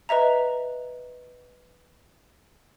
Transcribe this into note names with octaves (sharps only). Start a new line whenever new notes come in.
B4 D#5 E5 A#5